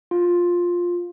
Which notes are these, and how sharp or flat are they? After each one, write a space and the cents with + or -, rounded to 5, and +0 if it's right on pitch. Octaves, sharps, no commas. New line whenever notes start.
F4 +10